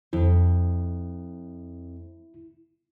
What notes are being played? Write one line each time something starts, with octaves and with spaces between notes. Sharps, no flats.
F2 E4